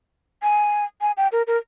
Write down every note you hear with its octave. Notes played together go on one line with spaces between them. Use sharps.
G#5
G#5
G5
A#4
A#4